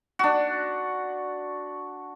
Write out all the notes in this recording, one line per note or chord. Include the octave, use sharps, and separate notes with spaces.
D4 F#4